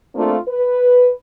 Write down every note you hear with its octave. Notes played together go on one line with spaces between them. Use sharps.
A3 A#3 C4 D4 F4
B4